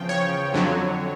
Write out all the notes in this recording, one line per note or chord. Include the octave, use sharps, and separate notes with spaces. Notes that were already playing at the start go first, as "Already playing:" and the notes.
Already playing: E2 C#3 F3 G5
C#5
F2 D3 F#3